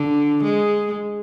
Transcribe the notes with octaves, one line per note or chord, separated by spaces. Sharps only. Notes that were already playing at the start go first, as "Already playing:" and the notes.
Already playing: D3
G#3